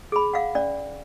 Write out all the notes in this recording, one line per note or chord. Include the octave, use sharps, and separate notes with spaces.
G#4 B5
F5 F#5
C#4 D5